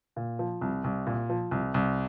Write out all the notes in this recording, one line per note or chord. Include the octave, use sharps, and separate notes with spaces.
A#2
F3
C2
C2
A#2
F3
C2
C2